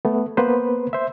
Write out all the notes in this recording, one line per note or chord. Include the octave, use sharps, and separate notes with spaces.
A3 B3
A#3 B3 B4 C5
C5 E5